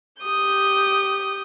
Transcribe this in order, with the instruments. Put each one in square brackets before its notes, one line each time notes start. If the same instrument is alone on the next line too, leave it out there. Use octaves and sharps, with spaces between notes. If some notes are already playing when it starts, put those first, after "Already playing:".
[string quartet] G4 D#6 G6